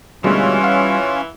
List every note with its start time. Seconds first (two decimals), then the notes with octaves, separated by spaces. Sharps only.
0.24 D2 B2 E3 G3 G#3 C#4 F4
0.63 F5 F#5